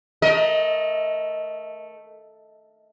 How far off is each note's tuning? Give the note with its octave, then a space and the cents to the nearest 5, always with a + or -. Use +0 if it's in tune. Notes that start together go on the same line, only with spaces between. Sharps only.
A3 +0 A#4 +10 D#5 +20